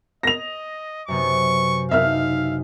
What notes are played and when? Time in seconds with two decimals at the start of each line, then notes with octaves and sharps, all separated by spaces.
0.23 D#5 A#6 F7
1.08 F#2 C3 B3 C#6
1.91 F#1 D#4 E5 F5 F6